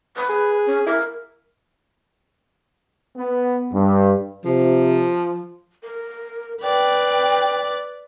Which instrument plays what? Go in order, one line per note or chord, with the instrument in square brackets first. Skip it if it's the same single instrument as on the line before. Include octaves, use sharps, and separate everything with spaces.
[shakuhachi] B4
[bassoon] G#4
[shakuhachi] C#4
[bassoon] E4 [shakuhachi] A#4
[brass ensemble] B3
G2
[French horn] C3 [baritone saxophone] F3
[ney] A#4
[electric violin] B4 D5 [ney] G5